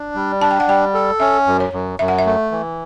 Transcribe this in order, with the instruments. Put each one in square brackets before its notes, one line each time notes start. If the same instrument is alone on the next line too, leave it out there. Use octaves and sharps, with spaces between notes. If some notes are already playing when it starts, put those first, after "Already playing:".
Already playing: [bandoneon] D4
G3
[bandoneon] D4 [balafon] A5
[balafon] G5
F#5
[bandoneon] G3 [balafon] G5
[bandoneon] A4
[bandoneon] C#4 [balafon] E5
[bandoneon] F#2
[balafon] C#5
[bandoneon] F#2
[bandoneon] F#2 [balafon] E5
[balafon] F#5
E5
[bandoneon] A3
E3